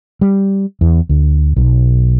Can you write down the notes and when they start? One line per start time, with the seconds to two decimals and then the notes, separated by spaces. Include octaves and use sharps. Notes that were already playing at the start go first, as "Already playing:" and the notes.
0.21 G3
0.81 E2
1.09 D2
1.56 B1